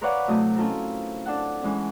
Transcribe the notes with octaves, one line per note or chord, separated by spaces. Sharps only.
A#4 B4 C#5 D5 F5 F#5
C3 F#3 A3 E4 D#5 D#6
C4 C#4 E4 F4 A4 A#4
D4 A4 F#5
E3 G#3 C#4